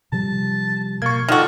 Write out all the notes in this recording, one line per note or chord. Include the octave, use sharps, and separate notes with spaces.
C3 F3 G3 A5
B2 A#3 C#6 G#6
D3 D#3 F4 F#4 A4 D5